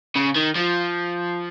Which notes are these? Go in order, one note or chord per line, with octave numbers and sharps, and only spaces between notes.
C#3
D#3
F3